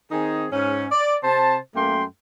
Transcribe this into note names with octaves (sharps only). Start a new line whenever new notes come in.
D#3 C4 D#4 G#4
G#2 C#4
D5
C3 C4 C5 A5
F#2 A3 A#3 G5 C6